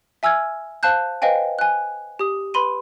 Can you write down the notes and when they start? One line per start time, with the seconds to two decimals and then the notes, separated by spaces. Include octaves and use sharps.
0.23 E5 G#5 E6 F6 G#6
0.83 C5 F5 A5 F#6 G6
1.22 B4 C5 D#5 F5 G5 G#5
1.59 G#5 F#6
2.19 G4 D#6
2.54 B4 B5 C6 D#7